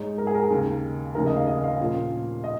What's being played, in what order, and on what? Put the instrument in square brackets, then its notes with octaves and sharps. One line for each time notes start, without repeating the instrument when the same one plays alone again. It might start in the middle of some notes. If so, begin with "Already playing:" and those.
Already playing: [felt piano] G#2 G#3 D#4 G#4 C#5
[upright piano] A#4
G#4
A#4
G#4
[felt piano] D#2 C#3 A#3
[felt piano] F1 D#2 C#3 [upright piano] A#4
[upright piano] D#5
F5
D#5
F5
[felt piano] A#1 A#2 F3 C#4 A#4
[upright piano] D#5